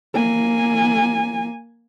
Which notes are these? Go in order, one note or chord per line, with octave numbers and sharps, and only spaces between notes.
A#3 G#5